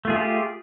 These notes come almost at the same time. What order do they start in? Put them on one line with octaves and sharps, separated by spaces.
A3 F4 G#4 G4